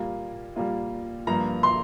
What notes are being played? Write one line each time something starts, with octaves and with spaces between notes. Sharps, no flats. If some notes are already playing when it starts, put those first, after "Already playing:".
Already playing: A#2 G3 A#3 F4
A#2 G3 A#3 F4
G2 F3 A#3 A#5
C6